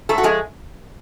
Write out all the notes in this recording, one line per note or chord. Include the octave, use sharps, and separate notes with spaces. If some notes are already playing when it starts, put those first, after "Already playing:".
G#2 A3 A4
F#4
F3 G#3 G#4